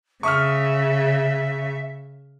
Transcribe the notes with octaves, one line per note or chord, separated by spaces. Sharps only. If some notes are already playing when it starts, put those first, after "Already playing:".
C#3 E5 C#6 D#6 F6